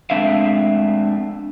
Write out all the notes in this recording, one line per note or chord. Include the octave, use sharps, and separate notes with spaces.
G#3 A3 C4 D4 E5 F5